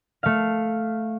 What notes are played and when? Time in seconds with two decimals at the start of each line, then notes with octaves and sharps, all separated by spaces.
0.23 A3 F5